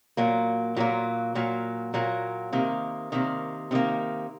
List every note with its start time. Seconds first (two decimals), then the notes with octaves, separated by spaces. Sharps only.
0.17 A#2 F#3 A#3
0.76 A#2 F#3 A#3
1.35 A#2 F#3 A#3
1.94 A#2 F#3 A#3
2.52 C3 D#3 A#3
3.12 C3 D#3 A#3
3.71 C3 D#3 A#3